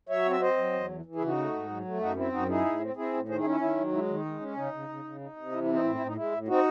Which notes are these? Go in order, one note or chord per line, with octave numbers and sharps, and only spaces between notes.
F#3 C#5 E5
C4
E5
C4 C5 D#5
F#3
E2
E3
E3
E4 G#4
C#3
D#4 F#4
A3
G#2
F#3
A3
F#2 D#4 F#4
C4 E4
F#2 D#4 F#4
D#4 E4 G#4
A2
C4
C4 E4 G#4
A2
D#3 G#4 C5
E4 G#4
C#4
E4
D#3 E4
F#3
G#3 E4
D#3
D#4
G#3
C#4
C#3 D#4
C#3
C#3
C#3
D#4
C3
E3 E4
E4
C4
D#4
A2 E4
E4
A2
D#4
G#3 E4
A2
C4 D#4 F#4